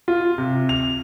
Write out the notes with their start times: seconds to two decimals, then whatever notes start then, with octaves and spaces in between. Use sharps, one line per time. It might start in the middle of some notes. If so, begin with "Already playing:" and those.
0.08 F4
0.38 C3
0.69 F7